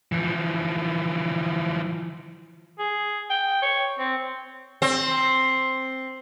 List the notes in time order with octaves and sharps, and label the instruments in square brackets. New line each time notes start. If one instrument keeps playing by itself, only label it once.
[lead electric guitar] E3 F3
[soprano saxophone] G#4
G5
C#5
C4
[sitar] C4